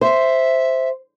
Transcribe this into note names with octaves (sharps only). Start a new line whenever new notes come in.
C5 E5